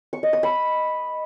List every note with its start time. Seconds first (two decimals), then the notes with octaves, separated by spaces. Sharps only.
0.13 C#6
0.23 D#5
0.33 D#6
0.43 B5